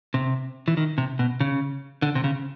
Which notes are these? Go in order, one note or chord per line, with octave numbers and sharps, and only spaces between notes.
C3
E3
D#3
C3
B2
C#3
D3
C3
C#3